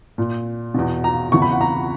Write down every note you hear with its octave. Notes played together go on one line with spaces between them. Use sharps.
A#2
E2 B2
A#5
E2 C#3 E3 C#6
B5
F#5
A#5